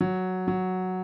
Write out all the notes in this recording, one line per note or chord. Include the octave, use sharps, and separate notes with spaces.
F#3
F#3